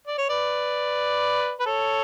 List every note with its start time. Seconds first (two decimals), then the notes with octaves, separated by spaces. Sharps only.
0.07 D5
0.18 C#5
0.29 B4 D5
1.60 B4
1.66 A4 C#5